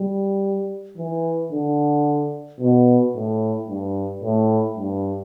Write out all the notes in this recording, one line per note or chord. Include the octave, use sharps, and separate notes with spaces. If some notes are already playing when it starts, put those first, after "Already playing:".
Already playing: G3
E3
D3
B2
A2
G2
A2
G2